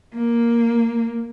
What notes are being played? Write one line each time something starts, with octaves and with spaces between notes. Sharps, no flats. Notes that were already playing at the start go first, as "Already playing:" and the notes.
A#3